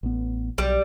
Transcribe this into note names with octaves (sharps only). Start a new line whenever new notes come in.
A1 B3
B1 G3